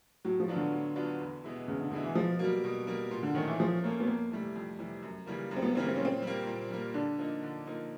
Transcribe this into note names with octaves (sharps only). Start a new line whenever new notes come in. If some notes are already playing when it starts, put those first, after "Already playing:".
A2 F#3
F3
F#3 B3 D4 F4
D3
A2
F#3 B3 D4 F4
E2
B2 G#3 B3 E4
E2 C#3
D3
B2 D3 G#3 B3 E4
E3
B2 F3
F#3 G3 A#3
B2
G3 A#3
A#2
D3
D#3 F3 A3 C#4
E3
A#2 F3
F3 A3 A#3 C#4
B3
F2 A#3
C3 E3 G3 A3
F2
C3 E3 G3
F#2
C#3 E3 G3 A#3
F#2
C4
B3
C#3 E3 G3 A#3 C4
C4
A#2 C#4
C4
G3 A#3
A#2
G3 A#3
D3 D4
F3 A#3 D#4
D3
F3 A#3 D#4